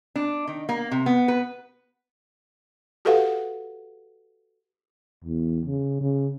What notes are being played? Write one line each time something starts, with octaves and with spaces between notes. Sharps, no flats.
D4
D#3
A#3
C3
B3
B4
F#4 G4 A4 B4 F5 F#5
E2
C#3
C#3